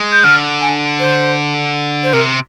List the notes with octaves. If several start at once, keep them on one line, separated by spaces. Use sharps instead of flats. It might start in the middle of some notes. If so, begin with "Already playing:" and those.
Already playing: G#3
G6
D3 F6
G#5
C5
C5
C3 A#4